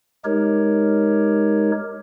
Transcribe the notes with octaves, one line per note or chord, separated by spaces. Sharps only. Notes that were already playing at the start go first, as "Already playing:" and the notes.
G#3 D#4 G4 A#4 C#5